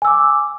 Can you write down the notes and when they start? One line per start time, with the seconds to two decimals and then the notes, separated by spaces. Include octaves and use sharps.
0.02 G#5
0.05 E6
0.07 D6